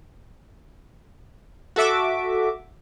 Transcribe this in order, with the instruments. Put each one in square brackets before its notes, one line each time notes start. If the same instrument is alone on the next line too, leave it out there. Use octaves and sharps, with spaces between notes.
[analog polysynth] F#4 A4 E5 D6